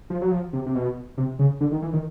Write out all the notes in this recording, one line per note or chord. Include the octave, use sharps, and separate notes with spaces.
F3
F#3
F3
C3
C3
B2
C3
C#3
D3
D#3
E3
D#3